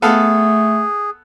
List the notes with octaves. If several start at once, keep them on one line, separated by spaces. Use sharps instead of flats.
A3 B3 G#4 A4 F5